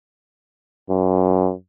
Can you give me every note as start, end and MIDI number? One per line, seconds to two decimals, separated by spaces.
0.89 1.52 42